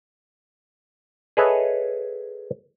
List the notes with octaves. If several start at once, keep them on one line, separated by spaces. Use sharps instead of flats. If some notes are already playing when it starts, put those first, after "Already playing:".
G#4 A4 B4 C#5 D#5 E5